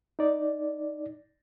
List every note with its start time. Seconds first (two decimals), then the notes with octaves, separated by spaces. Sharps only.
0.19 D#4 D5